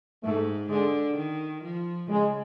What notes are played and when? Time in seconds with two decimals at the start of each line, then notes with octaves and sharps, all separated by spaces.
0.24 G#2 A3
0.70 D3 G#3
1.17 D#3
1.63 F3
2.09 C#3 G#3